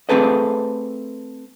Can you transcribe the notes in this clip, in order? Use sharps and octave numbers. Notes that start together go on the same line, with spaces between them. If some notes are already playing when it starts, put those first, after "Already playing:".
A3 C4 G#4 A4 B4 D#5